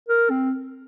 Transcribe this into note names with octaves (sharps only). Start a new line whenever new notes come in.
A#4
C4